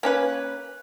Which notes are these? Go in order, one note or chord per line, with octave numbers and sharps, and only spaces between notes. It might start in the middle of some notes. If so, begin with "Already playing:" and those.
A#3 C#4 B4